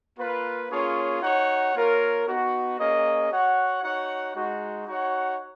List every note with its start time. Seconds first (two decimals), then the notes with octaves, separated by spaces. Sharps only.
0.18 A#3 F4 B4
0.70 A#3 C#4 F4 G#4 C#5
1.22 D#4 F#4 C#5 F#5
1.74 A#3 F4 A#4 C#5
2.27 B3 D#4 F#4
2.78 A#3 C#4 G#4 D#5
3.30 F#4 C#5 F#5
3.82 D#4 F#4 C#5 F#5
4.34 G#3 D#4 F#4
4.87 D#4 F#4 C#5 F#5